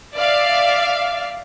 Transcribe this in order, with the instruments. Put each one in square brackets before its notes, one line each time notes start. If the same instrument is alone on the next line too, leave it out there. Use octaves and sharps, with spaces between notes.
[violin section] D5 E5 F5